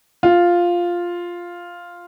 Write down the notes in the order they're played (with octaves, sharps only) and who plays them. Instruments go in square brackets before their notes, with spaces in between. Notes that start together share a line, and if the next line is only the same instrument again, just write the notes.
[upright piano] F4